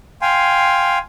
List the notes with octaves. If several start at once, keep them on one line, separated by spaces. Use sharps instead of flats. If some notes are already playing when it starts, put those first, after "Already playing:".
F5 G5 G#5 C6